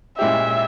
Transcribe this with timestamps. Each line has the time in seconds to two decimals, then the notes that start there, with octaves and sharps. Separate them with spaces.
0.18 A#2 G#3 C#4 E4 G4 E5